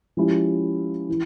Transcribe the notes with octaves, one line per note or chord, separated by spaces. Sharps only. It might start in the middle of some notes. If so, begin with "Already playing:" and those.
F3 G#3 C#4 E4 G4
E3